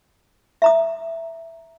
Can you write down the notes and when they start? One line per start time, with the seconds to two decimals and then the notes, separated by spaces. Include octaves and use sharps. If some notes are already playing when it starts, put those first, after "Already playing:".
0.62 E5 A#5 D#6